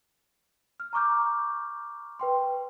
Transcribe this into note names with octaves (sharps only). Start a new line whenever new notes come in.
F6
A#5 C#6 D6 F6 G6
B4 G5 C6